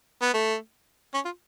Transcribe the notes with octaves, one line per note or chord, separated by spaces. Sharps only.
B3
A3
C#4
F4